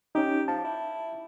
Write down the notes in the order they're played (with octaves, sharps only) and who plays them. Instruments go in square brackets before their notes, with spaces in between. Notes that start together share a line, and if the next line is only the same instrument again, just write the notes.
[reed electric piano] C#4 D#4 [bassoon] G4
[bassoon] F3 [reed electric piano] A5
[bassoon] E4